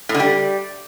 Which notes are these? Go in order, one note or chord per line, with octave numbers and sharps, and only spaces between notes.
A2
D3
G3